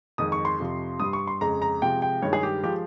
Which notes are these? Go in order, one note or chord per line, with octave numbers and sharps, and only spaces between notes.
F2 D#3 G#3 D#6
C#6
C6
F2 C3 F3
G2 G3 D#6
C#6
C6
F2 C#3 G#3 A#5
A#5
C3 F3 G#3 G5
G5
G2 D#3 G#3 C#5
G#4
G4
F3 G#3 G4